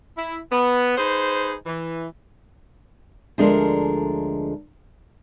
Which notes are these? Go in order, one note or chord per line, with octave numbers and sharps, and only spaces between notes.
E4
B3
D#4 G#4 B4 C5
E3
D2 F3 G#3 D4 A4 A#4